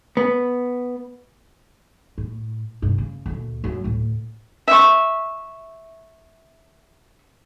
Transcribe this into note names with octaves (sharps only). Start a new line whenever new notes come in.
B3
A2
G2 C3
C#3
D2 A#2
F#2 F#3
D2 A2
E5 C#6